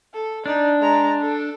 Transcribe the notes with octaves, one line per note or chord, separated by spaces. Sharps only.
A4
D4 D#4 D5
G#3 A#5
A4